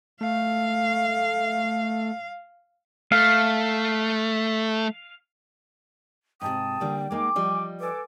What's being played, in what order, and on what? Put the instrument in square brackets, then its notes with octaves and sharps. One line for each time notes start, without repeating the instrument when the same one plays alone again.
[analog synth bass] A3 [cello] F5
[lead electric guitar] A3 [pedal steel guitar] F5
[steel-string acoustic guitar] G#2 C3 [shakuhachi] G5 [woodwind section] A5 D#6
[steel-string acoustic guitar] D3 G3 A#3
[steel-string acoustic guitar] G#3 A#3 D#4 [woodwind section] D6
[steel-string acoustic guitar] F3 G3 D#5
[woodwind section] A4 G#5 D6 [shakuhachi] B4